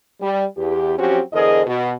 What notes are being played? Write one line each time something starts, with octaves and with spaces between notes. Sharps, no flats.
G3
E2 G4
F3 F#3 C4 C#4 F#4 G4
E2 D3 G#4 A#4 C5 D#5
B2